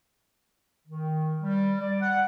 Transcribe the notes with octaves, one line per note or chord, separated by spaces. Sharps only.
D#3
G3
D5
F#5